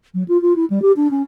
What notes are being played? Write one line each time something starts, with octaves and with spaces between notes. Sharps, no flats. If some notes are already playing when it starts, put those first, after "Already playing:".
F#3
F4
F4
E4
G3
G4
D4
C#4